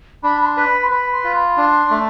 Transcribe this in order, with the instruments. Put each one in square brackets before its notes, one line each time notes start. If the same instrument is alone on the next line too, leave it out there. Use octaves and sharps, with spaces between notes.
[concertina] D4 [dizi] B5
[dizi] B5
C6
[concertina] B4
[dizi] B5
C6
[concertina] B4 [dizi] B5
[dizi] C6
[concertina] F4
[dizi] B5
[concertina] D4 [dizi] C6
[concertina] A3